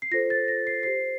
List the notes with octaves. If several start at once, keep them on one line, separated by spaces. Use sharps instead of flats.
C7
F4 A4 C5 A#6
A6
A#6
C7
G4 C5 C7